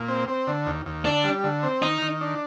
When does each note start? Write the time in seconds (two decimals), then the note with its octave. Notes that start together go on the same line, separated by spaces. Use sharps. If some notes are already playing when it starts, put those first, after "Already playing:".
Already playing: A#2
0.08 C4
0.28 C4
0.47 D3
0.66 D#2
0.86 D#2
1.05 D3 D4
1.24 G3
1.44 D3
1.63 C4
1.82 D#3 D#4
2.02 D#3
2.21 D4